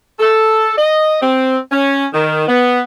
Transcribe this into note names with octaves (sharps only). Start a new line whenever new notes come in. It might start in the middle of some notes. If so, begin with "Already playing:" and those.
A4
D#5
C4
C#4
D#3
B3